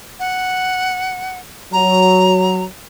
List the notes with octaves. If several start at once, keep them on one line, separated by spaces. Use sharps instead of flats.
F#5
F#3 A#5